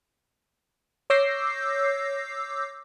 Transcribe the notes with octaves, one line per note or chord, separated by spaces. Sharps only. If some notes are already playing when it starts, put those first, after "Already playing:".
C#5 D6 E6 G6 A#6 C7